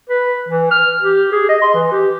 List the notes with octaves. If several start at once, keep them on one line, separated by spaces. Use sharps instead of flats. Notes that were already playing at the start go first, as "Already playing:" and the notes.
B4
E3
F6
G4
G#4
D#5
C6
E3
G4